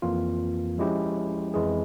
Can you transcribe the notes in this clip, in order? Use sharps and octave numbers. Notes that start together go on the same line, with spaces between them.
F2 E3 A#3 F4
F3 G#3 C#4 E4 G4
F2 E3 G#3 E4 G#4